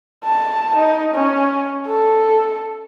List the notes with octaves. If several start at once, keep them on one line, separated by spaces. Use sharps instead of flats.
A5
D#4
C#4
A4